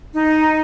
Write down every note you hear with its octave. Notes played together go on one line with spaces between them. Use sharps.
D#4